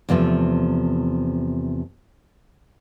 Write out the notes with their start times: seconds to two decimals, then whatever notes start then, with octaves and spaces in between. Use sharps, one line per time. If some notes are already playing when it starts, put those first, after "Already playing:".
0.09 E2 C3 F3 A3